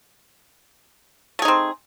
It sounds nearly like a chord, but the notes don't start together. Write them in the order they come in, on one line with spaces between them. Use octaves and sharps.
A3 G#4 D#4 C4